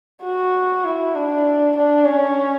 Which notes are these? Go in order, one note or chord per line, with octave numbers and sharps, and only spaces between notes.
F#4
E4
D4
D4
C#4